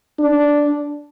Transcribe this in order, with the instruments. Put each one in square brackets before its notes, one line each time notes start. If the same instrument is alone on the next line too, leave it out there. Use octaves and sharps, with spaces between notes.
[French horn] D4